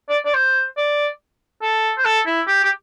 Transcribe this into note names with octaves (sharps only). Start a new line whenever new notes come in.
D5
D5
C5
D5
A4
C5
A4
E4
G4
G4